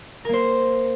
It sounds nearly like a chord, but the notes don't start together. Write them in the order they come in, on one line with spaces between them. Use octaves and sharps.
A#4 A#3 C5